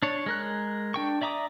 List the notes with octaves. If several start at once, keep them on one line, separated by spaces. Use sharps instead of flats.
D4 C#5
G#3 A#4 F#6
D4 G5 C#6
D5 E5 A#5 D6 D#6